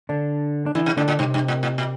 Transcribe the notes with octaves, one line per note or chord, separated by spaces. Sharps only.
D3 D4
D4
D3 E3 E4
C3
A2 D3 D4
A2
G2 C3 C4
G2
A2
A2
A#2